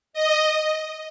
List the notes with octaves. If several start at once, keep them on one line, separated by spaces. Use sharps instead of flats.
D#5